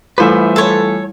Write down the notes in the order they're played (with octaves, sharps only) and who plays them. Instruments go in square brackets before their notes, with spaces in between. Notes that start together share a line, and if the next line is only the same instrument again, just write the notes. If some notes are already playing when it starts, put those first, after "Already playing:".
[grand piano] E3 A3 F4 [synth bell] G3 E4 [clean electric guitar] B4 C5 E5
[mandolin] A4 C#5